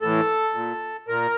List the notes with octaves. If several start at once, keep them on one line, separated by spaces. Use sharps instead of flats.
A2 E3 A4
A#2
A#2 A#4